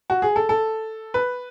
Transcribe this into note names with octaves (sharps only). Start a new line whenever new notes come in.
F#4
G#4
A4
A4
B4